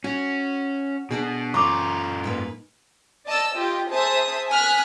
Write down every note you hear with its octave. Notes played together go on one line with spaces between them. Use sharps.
C#4 F#4
B2 D4 F#4 G#4
F#2 F4 A#5 C#6 D6
G#2 A#3 B4
D5 D#5 A5 E6
F4 G4 D#5
G#4 C5 E5 A5 D#6
G#5 D#6 F6 F#6 B6